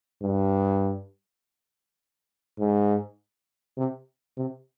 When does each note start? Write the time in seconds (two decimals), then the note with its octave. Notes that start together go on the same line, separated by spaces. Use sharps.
0.22 G2
2.59 G#2
3.77 C3
4.37 C3